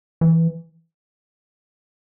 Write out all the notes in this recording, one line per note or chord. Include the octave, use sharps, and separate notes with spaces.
E3